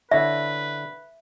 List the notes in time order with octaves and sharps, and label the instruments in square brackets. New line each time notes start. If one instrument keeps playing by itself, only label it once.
[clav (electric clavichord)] D3 E4 C#5 [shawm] B4 [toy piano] E5